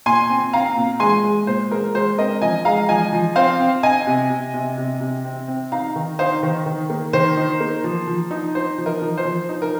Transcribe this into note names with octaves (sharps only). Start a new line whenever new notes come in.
A#2 G#5 C6
C4
C4 F5 A#5
A#2
G#3 G#5 C6
G#3
A#2 C5
G#3 A#4
G#3 C5
C4 A#4 D#5
F3 D#5 G#5
G#3 F5 A#5
F3 D#5 G#5
F3
C4 C5 F5
C4
C4 D#5 G#5
C3
C3
C3
C3
C3
C4
C4
D#4 F5 A#5
D#3
D#4 C5 F5
D#3
D#3
A#3
D#3 C5
D#4
A#3
F3
F3
D#4
D#4 C5
F3
A#4 D#5
F3
C5
F3
D#4
A#4